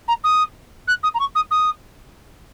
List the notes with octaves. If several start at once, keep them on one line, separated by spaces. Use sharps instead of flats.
A#5
D#6
F#6
D#6
A#5
C#6
D#6
D#6